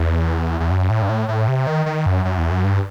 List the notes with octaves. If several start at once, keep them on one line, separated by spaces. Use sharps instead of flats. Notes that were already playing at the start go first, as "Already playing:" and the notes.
Already playing: E2
E2
F#2
A2
G2
A2
A2
C3
D#3
D#3
F#2
F#2
E2
F#2
G2